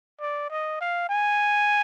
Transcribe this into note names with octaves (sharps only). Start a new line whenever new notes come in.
D5
D#5
F5
G#5